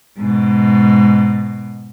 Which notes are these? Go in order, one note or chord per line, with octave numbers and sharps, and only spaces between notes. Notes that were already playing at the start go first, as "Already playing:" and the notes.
G#2 B2